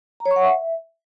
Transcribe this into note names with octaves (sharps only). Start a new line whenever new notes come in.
A#5
C#5
C#6
F#5
E5